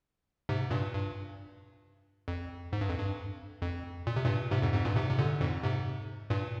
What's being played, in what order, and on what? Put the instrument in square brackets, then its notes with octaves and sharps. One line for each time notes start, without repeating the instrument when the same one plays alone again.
[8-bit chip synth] G#2 C3
G2 A#2
G2
F2
G#2
G2
F2
G2
F2
A#2
C3
G2 A#2
G#2 C3
F2 G#2
F2 G#2
G2 A#2
G#2 C3
C3
A#2 D3
F2 G#2
G#2 C3
G2 A#2